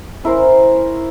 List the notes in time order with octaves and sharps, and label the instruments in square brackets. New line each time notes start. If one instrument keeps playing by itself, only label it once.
[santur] C#4 E4 A#4 C5